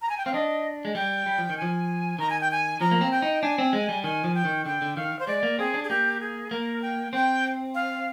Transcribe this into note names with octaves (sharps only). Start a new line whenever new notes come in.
A#5
G#5
G5
C4 F5
D4 D#5
G#3
G3 G5
G3
F3
D#3
F3 G#5
D#3 A#5
G#5
G5
G#5
F3 A#5
A#3
C4
G5
D#4
D4 G#5
C4
G#3
G3
D#3 G#5
F3
G5
D#3
D3 G5
D3
D#3 F5
C5
G#3 D5
A#3
C4 G#4
D4
G#4
A#3 G4
G#4
A#3 A#4
G5
C4 G5
F5